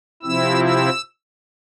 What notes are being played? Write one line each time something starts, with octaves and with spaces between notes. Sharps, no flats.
C3 F3 C4 E4 E6
E6